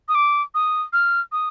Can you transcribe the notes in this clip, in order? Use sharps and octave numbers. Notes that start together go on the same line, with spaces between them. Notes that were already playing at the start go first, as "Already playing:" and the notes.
D#6
D6
D#6
F6
D#6